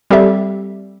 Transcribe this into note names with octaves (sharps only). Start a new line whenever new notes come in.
G3 C4 G4 A4 E5